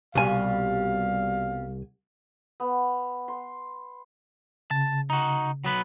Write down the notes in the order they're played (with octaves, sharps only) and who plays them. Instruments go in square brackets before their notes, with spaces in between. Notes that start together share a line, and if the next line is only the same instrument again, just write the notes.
[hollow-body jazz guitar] C2 G#5 [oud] B2 G3 F4 [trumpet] F5
[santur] B3
C6
[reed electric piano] C#3 [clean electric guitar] A5
[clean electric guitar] D#4 F#4
F#3 B3 B4